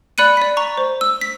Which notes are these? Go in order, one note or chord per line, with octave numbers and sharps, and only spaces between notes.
D5 B5 F#6 C#7 D#7
D5 B6
A#5 C#6
C5
E6
B6